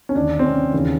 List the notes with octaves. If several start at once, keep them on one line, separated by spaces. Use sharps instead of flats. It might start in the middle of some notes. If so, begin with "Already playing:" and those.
C#4
D#2 D3 D4
C4
C#4
D#2 C#3 E3